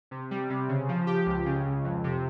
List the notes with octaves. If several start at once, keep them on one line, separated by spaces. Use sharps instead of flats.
C3
G3
C3
C#3
F3
G4
C#2
C#3
C#2
F2
C3